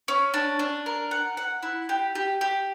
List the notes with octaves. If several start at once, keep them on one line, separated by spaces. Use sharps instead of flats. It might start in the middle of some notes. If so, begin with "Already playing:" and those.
C#4
D4
D4
A#4
F#5
F#5
E4
G4
G4
G4